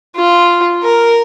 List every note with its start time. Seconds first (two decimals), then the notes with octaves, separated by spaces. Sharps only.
0.16 F4
0.83 A#4